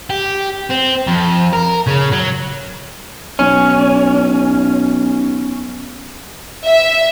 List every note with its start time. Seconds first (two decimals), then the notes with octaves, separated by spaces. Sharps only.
0.10 G4
0.70 C4
1.07 F2
1.53 A#4
1.88 C#3
2.13 F#3
3.39 B1 C#4
6.67 E5